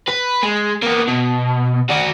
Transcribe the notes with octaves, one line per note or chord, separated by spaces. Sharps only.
B4
G#3
A#3 B3
B2
F#4 D5